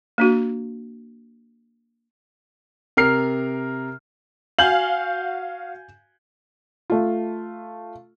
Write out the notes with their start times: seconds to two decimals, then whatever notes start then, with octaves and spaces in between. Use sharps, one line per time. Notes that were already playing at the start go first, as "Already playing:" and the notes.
0.18 A#3 D4 F#4
2.97 C3 A#4 F6 C7
4.59 F#4 F5 G#5 G6 F#7
6.90 A3 F4